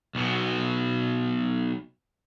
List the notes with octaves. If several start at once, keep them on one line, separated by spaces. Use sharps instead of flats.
B1 B2